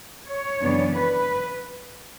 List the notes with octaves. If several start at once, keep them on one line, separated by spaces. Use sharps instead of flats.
C#5
F#2 C#3 E3 B3 D4
B4